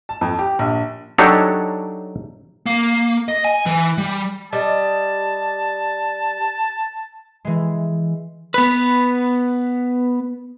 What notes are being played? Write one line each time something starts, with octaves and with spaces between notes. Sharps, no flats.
A5
F2
G4
A#1
F#3 D4 D#4 G4 A4 C#5
A#3
D#5
G#5
E3
G3
G3 D#5 A5
E3 G#3
B3 B4